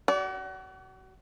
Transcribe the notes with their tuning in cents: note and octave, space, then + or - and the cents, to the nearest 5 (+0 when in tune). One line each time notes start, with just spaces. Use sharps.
F#4 +35 D5 -30